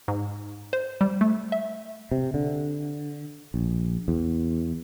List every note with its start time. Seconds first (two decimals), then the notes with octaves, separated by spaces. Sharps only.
0.08 G#2
0.73 C5
1.01 G3
1.21 A3
1.52 E5
2.11 C3
2.34 D3
3.54 A#1
4.08 E2